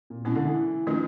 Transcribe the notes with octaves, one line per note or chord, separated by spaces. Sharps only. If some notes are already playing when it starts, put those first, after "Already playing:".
A#2
B2 G#3 C#4 E4
D3
E3
D#3 F3 A3 C#4 F4